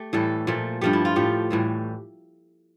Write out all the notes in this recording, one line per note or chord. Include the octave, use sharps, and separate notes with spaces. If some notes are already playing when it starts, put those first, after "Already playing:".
Already playing: A3 G4
A2 E3 G3 A4
A#2 F3 A3
G2 F3 A3 G4
E4
F4
A2 F3 A3 G4
A2 E3 G3